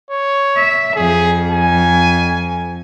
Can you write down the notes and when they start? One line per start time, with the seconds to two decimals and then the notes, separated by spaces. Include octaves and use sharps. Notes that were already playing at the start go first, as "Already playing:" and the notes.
0.10 C#5
0.56 E5
0.96 F2 G#4
1.51 G#5